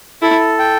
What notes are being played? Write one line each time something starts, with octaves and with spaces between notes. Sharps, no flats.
E4 A4
G5